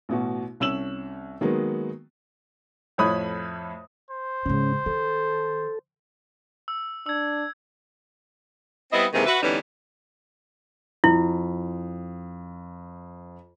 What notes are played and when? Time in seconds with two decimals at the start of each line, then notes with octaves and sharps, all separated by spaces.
0.09 A1 B2 F#4
0.60 C2 C#4 E6 E7 F#7
1.41 D#3 F#3 G#3 A#3 B3
2.98 F2 A2 C#5 B5 D#6
4.10 C5
4.46 G#2 C#3 C#4
4.86 D#3 A4
6.68 E6
7.06 D4 E6 G#6
8.92 G3 B3 C4 E4 D#5
9.13 G#2 C3 D#3 E3 A#3 G#4
9.26 F#4 B4 E5
9.42 D3 E3 G3 B3 C#4 D#4
11.04 F2 E4